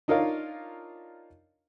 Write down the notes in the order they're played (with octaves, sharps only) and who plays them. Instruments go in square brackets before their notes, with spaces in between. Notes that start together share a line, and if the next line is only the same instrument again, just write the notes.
[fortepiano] D4 D#4 F4 A#4 C#5 F5